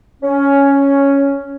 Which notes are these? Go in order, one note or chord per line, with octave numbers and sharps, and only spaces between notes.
C#4